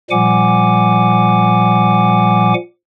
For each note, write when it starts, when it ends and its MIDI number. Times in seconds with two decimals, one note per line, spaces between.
0.11 2.54 46
0.11 2.54 53
0.11 2.54 55
0.11 2.54 78
0.11 2.54 80
0.11 2.54 86